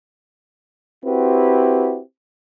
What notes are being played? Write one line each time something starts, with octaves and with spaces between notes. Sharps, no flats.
C4 E4 F#4 G4 B4